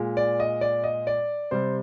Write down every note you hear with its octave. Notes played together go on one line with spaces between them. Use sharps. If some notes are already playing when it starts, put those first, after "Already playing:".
Already playing: A#2 G#3
D5
D#5
D5
D#5
D5
C3 G3 C5